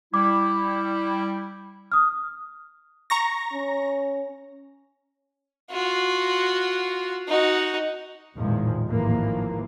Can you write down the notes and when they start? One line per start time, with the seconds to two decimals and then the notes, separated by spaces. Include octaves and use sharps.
0.14 G3 E4 D6
1.92 D#6 F6
3.10 A#5 C#6 A#6
3.53 C#4
5.70 F4 F#4
7.28 D#4 F#4
8.35 A1 E2 A#2 D#3 F3 G#3
8.85 G#1 D#2 A2 E3 F3 A#3